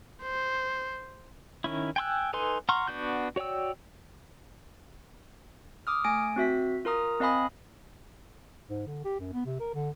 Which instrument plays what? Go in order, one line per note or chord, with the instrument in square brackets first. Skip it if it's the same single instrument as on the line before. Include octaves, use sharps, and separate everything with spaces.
[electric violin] C5
[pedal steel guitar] D#3 C#4 E4
G5 G#5 C6 E6 F#6
D#4 A4 B4 G#5 C6
F#5 A#5 C6 C#6 F6
B3 D4 F#4 G6
F#4 C#5 D5 G5 E6
[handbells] D6 D#6 F6
A3 G#5 A#6 D7
C4 F#4 E5 B6
F4 A#4 A#5 D#6
C4 D#5 F5 G#5 B5 D#6
[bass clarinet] G#2
D3
G4
F#2
B3
C3
A#4
D3